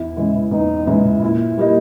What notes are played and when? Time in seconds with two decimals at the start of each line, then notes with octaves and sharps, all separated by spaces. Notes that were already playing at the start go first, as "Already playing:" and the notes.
Already playing: E2 E4
0.17 C#3 E3 G#3
0.51 E2 D#4
0.87 C#3 E3 G#3 E4
1.22 A#2 E4
1.58 G3 A#3 D#4